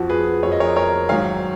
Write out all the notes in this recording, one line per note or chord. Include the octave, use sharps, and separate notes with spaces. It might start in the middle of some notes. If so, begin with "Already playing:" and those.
Already playing: F2 F3 F#4
G#4 B4
F2 F3 C#5
D#5
A#4 C#5
A#4 C#5
G#2 D#3 F#3 C#5 F5